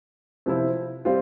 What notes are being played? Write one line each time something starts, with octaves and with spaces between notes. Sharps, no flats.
C3 F3 C4 E4
G3 C4 F4